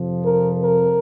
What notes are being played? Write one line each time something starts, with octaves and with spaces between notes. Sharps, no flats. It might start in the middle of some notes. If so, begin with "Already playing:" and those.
Already playing: F2 C3 F3
A#4
A#4